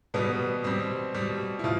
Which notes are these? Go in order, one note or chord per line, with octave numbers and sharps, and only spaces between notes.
B2 G3 B3
B2 G3 C4
B2 G3
E4
B2 F4